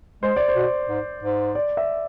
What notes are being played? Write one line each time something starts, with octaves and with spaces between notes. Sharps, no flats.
G#3 C5
D5
C5
B2
G#2
G#2
D5
E5